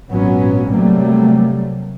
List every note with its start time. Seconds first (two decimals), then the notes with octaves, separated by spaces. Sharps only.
0.10 G#1 A#2 F#3 B3 C#4
0.69 C3 F#3 G3 A3 A#3